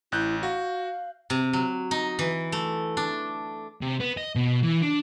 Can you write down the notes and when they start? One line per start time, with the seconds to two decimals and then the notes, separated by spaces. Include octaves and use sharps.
0.12 A1 E4 F#6 G6
0.43 F#4 F5
1.30 C3
1.53 F#3
1.91 D#4
2.19 E3
2.52 A3
2.97 D4
3.82 C3
4.00 B3
4.17 D#5
4.36 B2
4.63 E3
4.82 D4